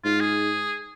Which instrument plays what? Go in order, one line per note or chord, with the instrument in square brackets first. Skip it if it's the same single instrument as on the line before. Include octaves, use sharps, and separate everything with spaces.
[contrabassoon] G#2 [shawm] F4
[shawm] G#4